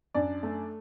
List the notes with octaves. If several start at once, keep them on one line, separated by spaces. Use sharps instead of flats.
F#2 D4 D5
A3